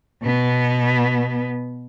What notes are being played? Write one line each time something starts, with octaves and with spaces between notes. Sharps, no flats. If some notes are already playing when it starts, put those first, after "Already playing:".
B2 B3